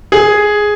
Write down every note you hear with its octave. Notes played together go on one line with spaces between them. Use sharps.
G#4